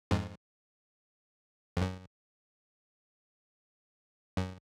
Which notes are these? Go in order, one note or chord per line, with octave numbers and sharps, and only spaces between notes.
F2 G#2
F2
F#2
F#2